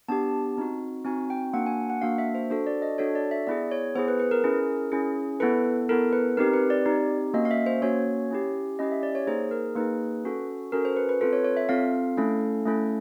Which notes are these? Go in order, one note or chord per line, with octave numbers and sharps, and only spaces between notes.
B3 D4 G4 A5
C4 D#4 F#4
C4 D#4 F#4 G#5
G5
A#3 D4 F#4 F#5
G#5
F#5
A#3 D4 F#4 F5
E5
C5
D4 F#4 A4 C5
D5
D#5
D4 F#4 A4 C#5
D5
E5
B3 E4 G#4 D5
C#5
B3 E4 G#4 C5
B4
B4
A#4
C#4 E4 G#4
C#4 E4 G#4
B3 E4 A4 B4
B3 E4 A4 A#4
B4
C4 D#4 G4 A#4
B4
D5
C4 D#4 G4
A#3 C#4 F#4 D#5
F5
E5
C5
A#3 C#4 F#4 C#5
C#4 E4 G4
C#4 E4 G4 D#5
E5
D5
C#5
A#3 D#4 G#4 C5
A#4
A#3 D#4 G#4 B4
C#4 F#4 A4
C#4 F#4 A4 A#4
C5
B4
B4
C4 F4 A4 B4
C#5
C#5
E5
C4 F4 A4 F5
A3 C#4 E4 A4
A3 C#4 E4 A4